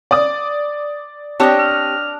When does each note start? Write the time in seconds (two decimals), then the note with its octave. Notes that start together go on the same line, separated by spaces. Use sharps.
0.11 D5 D#6
1.40 C4 D4 G4 C#5 D#5
1.59 F6